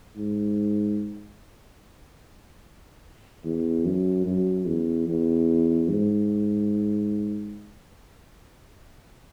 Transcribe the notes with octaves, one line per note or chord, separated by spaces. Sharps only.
G#2
E2
F#2
F#2
E2
E2
G#2